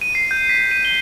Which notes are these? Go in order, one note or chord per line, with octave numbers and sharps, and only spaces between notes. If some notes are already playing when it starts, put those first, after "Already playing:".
D#7
C7
G6
B6
D#7
G7